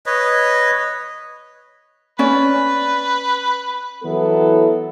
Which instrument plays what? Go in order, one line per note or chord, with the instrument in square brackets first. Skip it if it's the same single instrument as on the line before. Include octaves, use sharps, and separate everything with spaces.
[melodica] B4 C#5 D#5
[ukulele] C#4 D5 [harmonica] B4
[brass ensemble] E3 F#3 B3 E4 A4